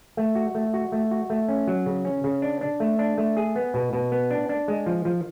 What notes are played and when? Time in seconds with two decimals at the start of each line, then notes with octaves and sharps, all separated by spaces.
0.17 A3
0.35 F#4
0.55 A3
0.74 F#4
0.92 A3
1.11 F#4
1.30 A3
1.48 C#4
1.68 F#3
1.86 C#3
2.05 C#4
2.24 C#3
2.42 D4
2.61 D4
2.80 A3
2.99 D4
3.18 A3
3.37 G#4
3.56 B3
3.74 B2
3.93 B2
4.12 B3
4.31 D4
4.49 D4
4.68 G#3
4.86 F3
5.05 F3